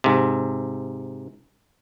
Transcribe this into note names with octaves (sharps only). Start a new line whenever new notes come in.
G#2 C3